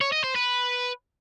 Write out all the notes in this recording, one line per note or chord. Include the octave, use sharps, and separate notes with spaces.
C#5
D#5
C5
B4